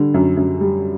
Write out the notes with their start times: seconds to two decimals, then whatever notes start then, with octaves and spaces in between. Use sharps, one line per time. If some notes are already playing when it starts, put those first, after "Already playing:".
Already playing: D3 G3
0.14 F#2
0.37 F#2
0.61 G3